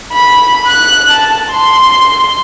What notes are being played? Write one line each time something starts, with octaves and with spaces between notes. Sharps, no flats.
B5
F#6
A5
C6